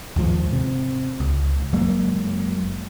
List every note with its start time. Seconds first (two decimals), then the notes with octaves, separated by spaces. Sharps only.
0.16 D#2 G#2 F3
0.53 C3
1.20 C#2
1.73 F#1 F#3 G#3 A#3